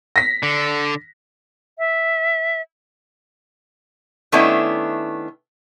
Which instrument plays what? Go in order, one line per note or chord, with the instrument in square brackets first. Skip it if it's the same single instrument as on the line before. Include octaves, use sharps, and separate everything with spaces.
[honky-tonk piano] A#6 B6
[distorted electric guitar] D3
[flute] E5
[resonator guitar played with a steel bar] D#3 A3 B3 C#4 D4 E4